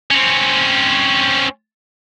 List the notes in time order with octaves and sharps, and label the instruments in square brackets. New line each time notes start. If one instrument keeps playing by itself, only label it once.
[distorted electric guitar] C4 C#4